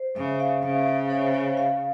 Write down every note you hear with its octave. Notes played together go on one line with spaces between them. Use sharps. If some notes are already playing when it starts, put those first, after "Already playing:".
Already playing: C5
C#3 E5
F5
C#3 E5
C#5
C5
C#5
F5